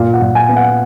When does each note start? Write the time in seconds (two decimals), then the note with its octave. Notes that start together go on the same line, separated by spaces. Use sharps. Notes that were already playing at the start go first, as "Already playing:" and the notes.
Already playing: A#2 F5
0.14 F#5
0.21 A#2
0.35 G#5
0.49 B3
0.57 F#5